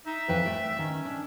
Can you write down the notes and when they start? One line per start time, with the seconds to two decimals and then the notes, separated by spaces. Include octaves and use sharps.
0.06 D#4 E5
0.28 F2 E3 B4 G5
0.46 A3 G5
0.79 D#3 C#4
1.05 D4